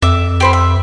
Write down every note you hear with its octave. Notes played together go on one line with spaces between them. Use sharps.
F2 E5 D6
G4 C5 B5
E5